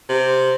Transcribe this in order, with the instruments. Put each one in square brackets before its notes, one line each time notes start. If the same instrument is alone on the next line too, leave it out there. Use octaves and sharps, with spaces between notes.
[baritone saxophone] C3